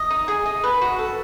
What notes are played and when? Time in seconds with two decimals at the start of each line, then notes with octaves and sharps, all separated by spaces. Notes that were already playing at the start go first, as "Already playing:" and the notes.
Already playing: D#5
0.10 D#4
0.28 G#4
0.46 D#4
0.64 B4
0.81 F#4
0.99 A4